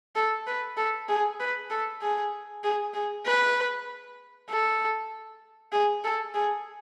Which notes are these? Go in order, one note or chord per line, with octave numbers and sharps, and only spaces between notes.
A4
B4
A4
G#4
B4
A4
G#4
G#4
G#4
B4
A4
G#4
A4
G#4